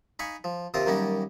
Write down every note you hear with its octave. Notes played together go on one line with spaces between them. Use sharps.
D#4 F5 G#5 B5 C#6
F3
D#2 C3 D#3 F4 A#4 D#6
F#2 D#3 G3 A#3 C#4 D#4